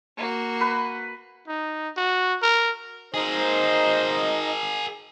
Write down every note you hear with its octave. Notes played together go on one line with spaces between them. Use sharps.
A#3 F#4
B4
D#4
F#4
A#4
A#3 D#4 G#4 A#4 C5 D#5